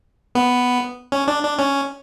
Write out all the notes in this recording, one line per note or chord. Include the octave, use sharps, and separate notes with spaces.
B3
C#4
D4
D4
C#4